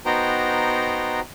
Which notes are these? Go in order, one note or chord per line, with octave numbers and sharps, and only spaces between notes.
B3 D#4 F#4 C5 G5 A#5